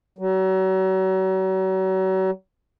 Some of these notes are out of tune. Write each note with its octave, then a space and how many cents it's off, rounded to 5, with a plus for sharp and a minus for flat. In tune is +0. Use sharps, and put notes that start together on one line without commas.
F#3 +35